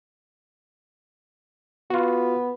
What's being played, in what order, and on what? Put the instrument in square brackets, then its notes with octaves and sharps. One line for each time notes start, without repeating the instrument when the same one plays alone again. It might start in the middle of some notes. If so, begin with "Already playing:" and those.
[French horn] B3 [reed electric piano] F4 F#4